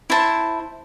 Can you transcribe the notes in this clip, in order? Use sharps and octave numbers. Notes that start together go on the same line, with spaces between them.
E4 C5 A5